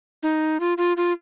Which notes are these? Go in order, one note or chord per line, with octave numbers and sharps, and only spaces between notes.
D#4
F4
F4
F4